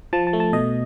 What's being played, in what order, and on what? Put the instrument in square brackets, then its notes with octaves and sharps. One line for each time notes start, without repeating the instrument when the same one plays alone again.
[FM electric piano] F3 A5
A5
A3
A5
B2 D#5